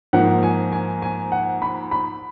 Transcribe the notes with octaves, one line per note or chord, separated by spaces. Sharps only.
G#2 F3 A#3 D#4 F#5
G#5
G#5
G#5
F#5
B5
B5